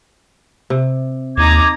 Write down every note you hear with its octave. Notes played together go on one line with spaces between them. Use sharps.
C3
D#2 D#4 A#5 D6 G#6